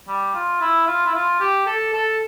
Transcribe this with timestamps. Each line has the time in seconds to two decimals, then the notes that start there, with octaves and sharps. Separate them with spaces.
0.08 G3
0.35 F4
0.61 E4
0.87 F4
1.06 E4
1.14 F4
1.40 G4
1.67 A4
1.93 A4